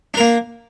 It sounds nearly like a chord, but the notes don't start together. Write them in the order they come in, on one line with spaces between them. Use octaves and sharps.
D4 A#4 A#3